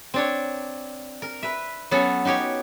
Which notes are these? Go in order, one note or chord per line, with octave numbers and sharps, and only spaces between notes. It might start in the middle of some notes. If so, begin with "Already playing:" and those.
C4 D4 C#5
A#4
B4 E5
F#3 B3 C#4 A4 F#5
D#4 F#4 G4 C#5